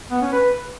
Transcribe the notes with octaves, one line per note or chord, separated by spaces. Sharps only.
B3
C#4
B4